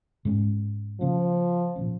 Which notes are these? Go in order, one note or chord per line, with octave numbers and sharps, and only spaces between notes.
G#2 G#3 C#4
C#3 F3 A#3 C#4
A#2 F3 C#4